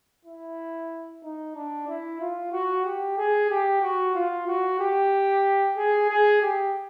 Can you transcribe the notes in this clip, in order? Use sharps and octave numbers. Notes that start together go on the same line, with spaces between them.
E4
D#4
D4
E4
F4
F#4
G4
G#4
G4
F#4
F4
F#4
G4
G#4
G#4
G4